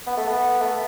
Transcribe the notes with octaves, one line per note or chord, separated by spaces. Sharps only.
B3
A3
B3
A3